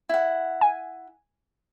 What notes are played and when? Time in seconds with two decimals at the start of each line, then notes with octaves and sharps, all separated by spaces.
0.09 E4 F#5
0.61 G#5